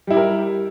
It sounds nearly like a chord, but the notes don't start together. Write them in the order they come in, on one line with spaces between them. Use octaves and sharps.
G3 E4 G4 A#4